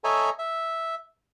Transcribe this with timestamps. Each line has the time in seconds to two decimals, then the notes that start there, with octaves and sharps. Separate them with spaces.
0.04 A4 C#5 D#5 E5 G#5 A#5
0.39 E5